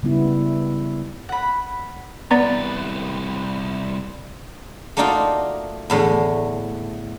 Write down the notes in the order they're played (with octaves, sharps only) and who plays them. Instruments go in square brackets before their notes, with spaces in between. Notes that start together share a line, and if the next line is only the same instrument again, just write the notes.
[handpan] C#3 G3 B3 E4
[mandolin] F#5 B5
[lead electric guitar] C2 B4 [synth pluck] B3 [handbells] D5 A#5
[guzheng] A3 A#3 D4 D#4 F4 F#4
E2 A2 D3 A3